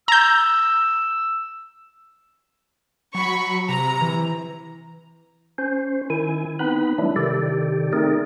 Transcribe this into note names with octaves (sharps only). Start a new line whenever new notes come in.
A#5 E6 G6
F#3 B5 C#6
C3 A#5
E3
C#4 C5
D#3 E4 G#5
B3 C4 D#4 B4 B5
E3 F#3 G3 A3 D4 E4
C3 D#3 G4 A4 D5
A3 C4 D#4 G#4 A#4 D5